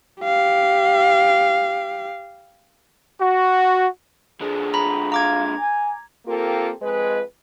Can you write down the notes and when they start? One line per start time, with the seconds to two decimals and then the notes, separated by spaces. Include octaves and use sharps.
0.23 G4 F5
3.20 F#4
4.41 D3 G#3 G#4
4.74 A#5 B5
5.12 F5 A#5 D6 G#6
5.60 G#5
6.27 A#3 C4 F4 G4 A4 A#4
6.82 F2 G#3 B4